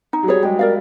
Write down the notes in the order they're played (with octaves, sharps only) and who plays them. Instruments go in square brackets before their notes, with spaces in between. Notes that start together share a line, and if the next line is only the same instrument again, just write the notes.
[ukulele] D#4
[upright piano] F#3
[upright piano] G3 [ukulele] G#4 C#5
[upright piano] G#3 [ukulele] G4
[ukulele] A#4 D5 F5